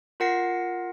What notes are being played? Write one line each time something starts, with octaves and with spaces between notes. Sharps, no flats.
F4 A#4 F#5 A#6 C7